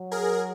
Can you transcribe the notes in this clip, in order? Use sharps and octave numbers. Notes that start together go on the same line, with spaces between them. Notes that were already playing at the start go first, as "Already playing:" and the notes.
Already playing: F#3
G#4 A#4